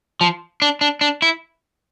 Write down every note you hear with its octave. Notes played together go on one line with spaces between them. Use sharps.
F3
D4
D4
D4
E4